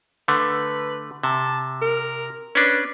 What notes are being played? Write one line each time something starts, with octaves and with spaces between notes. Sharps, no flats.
D3 A3 B4
C3 A5
A#4
C#4 D4 B4